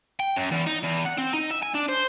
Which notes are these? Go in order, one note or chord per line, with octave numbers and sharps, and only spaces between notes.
G5
F#2
E2
D#4
E2
F#5
C4
D#4
E5
G#5
D4
C5